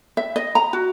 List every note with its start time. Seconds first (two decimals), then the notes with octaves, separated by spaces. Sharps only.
0.17 E5
0.36 D#5
0.55 A#5
0.73 F#4